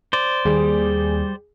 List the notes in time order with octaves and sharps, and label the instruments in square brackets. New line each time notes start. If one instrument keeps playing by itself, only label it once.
[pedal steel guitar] C5 D5
[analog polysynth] D#2 [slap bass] G3 [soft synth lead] G#4